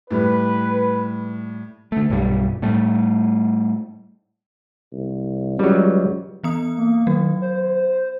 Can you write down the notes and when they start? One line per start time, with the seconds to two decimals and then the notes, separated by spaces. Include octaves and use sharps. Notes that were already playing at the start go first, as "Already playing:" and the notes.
0.11 A2 G3 B4
1.92 D3 A3
2.10 B1 G2 G3
2.62 A2 G3 A3
4.92 C2
5.59 C#2 F#3 G3
6.44 E3 B3 D#6
6.77 A#3
7.07 D#3 F#3
7.42 C5